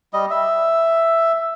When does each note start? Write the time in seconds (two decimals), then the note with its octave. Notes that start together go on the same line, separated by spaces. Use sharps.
0.13 G3 D#5
0.31 E5